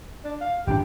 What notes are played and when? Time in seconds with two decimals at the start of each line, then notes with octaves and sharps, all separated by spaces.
0.24 D4
0.41 F5
0.67 G#1 F#2 D4 G4